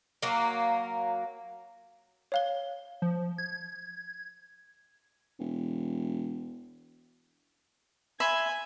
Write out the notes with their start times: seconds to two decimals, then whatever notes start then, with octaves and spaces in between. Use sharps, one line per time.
0.22 F#3 A#3
2.32 C#5 F5 G7
3.02 F3
3.38 G#6
5.39 E1
8.20 E5 G#5 B5 C6